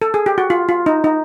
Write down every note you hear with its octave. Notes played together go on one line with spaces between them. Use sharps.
A4
G#4
G4
F#4
F4
F4
D#4
D#4